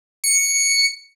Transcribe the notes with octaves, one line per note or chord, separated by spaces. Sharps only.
C#7